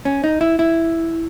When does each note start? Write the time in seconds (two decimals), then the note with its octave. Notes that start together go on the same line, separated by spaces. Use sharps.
0.05 C#4
0.24 D#4
0.41 E4
0.59 E4